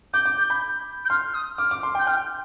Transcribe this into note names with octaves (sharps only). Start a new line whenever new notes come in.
D6 G6
D6
G6
B5
G6
C6 F6
F6
D#6
D6 F6
D6
C6
G5
G6
G5 F6